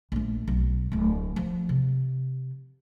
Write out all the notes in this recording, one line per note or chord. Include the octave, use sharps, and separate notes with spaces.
A#1 A3
B1
D1 A3
F3
C3